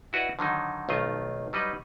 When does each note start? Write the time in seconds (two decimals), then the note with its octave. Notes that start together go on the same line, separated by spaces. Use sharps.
0.13 E4 F#4 B4 D5 D#5
0.39 D3 D#3 F#3 D#4
0.89 B1 F2 D#3 A3 F4 D#5
1.53 F#3 G3 D#4 B4 D#5